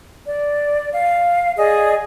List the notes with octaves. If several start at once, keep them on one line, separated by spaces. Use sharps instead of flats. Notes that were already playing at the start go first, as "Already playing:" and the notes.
D5
F5
G#4 D5 D#5